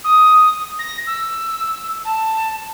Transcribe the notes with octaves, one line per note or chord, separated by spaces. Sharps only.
D#6
A#6
E6
A5